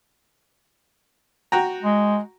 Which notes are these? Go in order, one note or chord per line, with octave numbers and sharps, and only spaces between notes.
F#4 G5 A#5
G#3